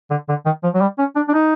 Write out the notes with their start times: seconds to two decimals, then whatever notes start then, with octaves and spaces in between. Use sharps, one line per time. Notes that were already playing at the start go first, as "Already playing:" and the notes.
0.11 D3
0.29 D3
0.46 D#3
0.63 F3
0.74 F#3
0.81 G3
0.99 C#4
1.16 D4
1.29 D4
1.34 D#4